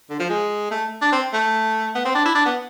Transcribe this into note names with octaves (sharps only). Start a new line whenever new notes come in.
D3
F3
G#3
A3
D4
C4
A3
B3
C4
D4
E4
D4
B3